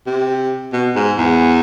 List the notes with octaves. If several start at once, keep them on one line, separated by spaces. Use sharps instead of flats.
C3
B2
G#2
E2